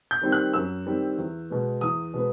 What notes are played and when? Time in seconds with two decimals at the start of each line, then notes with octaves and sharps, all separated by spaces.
0.11 G6
0.22 D#3 G3 C4
0.32 F#6
0.54 F#2 E6
0.86 D#3 G3 C4
1.18 E2
1.50 B2 G#3 B3
1.81 E2 D#6
2.14 B2 G#3 B3